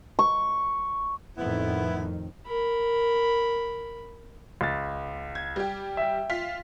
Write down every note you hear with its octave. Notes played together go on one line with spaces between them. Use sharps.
C#6
F2 A2 D#3 B3 E4
A#4 B5
C#2 A6
G#6
G3 G4
E5 G5
F4 B6